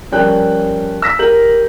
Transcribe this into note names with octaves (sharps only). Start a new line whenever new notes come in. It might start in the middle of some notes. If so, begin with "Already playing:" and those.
F3 G3 C#4 A#4 G5 F#6
E6 A#6 B6
G4 A#4 G6 F#7